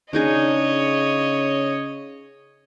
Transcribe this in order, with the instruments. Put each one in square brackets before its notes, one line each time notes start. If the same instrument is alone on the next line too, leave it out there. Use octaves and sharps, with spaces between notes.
[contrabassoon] C#3 [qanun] D4 D#4 G#4 [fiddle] C#5 D#5